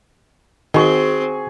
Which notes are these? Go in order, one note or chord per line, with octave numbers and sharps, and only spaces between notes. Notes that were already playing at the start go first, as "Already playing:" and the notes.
D#3 C4 F#4 G#4 C#6